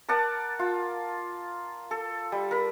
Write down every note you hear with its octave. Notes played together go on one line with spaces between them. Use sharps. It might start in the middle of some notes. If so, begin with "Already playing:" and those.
A#4 D5 F#5 A5
F4
A4
G3
A#4 B5